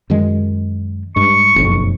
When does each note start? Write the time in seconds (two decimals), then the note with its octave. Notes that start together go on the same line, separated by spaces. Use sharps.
0.10 F#2 D#3 G#3
1.16 G2 G#3 C#6
1.56 F#1 B1 F2